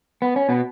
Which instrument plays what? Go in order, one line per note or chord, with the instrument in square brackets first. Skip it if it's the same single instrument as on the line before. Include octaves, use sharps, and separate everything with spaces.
[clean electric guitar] B3
C#4
B2 B3